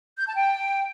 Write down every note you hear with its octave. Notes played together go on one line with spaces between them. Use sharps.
G6
A5
G5